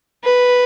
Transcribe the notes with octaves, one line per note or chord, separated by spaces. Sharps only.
B4